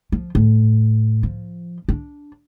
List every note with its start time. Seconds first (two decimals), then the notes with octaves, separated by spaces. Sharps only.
0.12 F3
0.35 A2
1.23 F3
1.89 D4